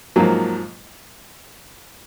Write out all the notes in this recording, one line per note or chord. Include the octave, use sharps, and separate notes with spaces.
G#2 F3 F#3 A#3